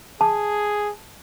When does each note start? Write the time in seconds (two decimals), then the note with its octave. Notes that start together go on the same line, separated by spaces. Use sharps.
0.21 G#4 A5